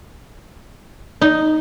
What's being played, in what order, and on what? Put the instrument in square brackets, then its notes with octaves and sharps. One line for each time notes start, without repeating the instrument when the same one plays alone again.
[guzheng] D#4